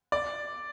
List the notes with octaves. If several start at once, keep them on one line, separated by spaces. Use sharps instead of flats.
D5